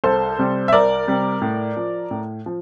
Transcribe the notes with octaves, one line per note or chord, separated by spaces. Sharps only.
C2 A4 C5
C3 G3
E5
C2 A#4 D5
C3 G3
A2
F3
A2
F3